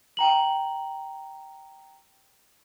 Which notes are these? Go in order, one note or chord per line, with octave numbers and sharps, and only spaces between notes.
G5 A#5 F#7